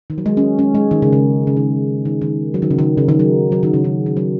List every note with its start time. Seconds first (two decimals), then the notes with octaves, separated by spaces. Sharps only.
0.10 D#3
0.18 F#3
0.26 G#3
0.37 C#4
0.59 C#4
0.75 G#3
0.91 D#3
1.02 C#3
1.13 C#3
1.47 C#3
1.57 D#3
2.05 D#3
2.22 D#3
2.54 F#3
2.62 D#3
2.71 C#3
2.79 D#3
2.98 C#3
3.09 D#3
3.19 F#3
3.52 F#3
3.63 D#3
3.74 C#3
3.84 D#3
4.06 D#3
4.17 F#3